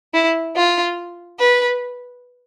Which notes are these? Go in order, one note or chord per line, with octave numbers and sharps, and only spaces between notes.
E4
F4
B4